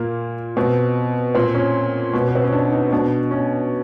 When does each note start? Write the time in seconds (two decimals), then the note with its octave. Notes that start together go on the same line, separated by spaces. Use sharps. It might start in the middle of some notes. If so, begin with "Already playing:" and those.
Already playing: A#2 A#3
0.57 B2 C4
1.35 A#2 C4
1.55 C#4
2.13 B2
2.27 B3
2.35 C4
2.44 C#4
2.52 D4
2.72 D#4
2.92 B2 D4
3.31 C#4